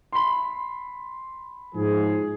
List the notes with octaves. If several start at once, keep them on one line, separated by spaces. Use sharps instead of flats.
B5 C6
G#2 F3 G#4